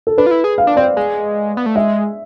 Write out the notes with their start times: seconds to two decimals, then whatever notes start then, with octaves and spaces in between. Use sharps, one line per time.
0.07 A4
0.18 D4 B4
0.26 F4
0.31 E4
0.44 G#4
0.58 F5
0.67 D4
0.76 C4 D5
0.97 G#3
1.57 B3
1.66 A3
1.76 G#3 E5